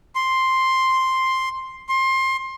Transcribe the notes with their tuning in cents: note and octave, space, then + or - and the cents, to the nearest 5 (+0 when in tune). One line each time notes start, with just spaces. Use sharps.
C6 +5
C6 +25